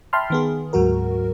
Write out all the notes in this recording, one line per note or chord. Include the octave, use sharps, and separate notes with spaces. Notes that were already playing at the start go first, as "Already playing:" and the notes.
E5 G5 A5 B5 C6 F6
D#3 B3 G#4
D2 G#2 F#3 F#4 A#4